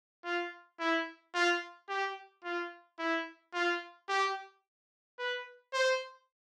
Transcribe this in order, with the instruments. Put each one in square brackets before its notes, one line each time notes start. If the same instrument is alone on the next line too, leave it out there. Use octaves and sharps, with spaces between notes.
[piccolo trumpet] F4
E4
F4
G4
F4
E4
F4
G4
B4
C5